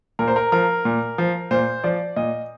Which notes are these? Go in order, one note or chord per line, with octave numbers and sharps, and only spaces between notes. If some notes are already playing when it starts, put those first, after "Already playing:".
A#2 A#4
C5
A#4
F3 A#4
A#2
F3
A#2 C5
F3 D5
A#2 D#5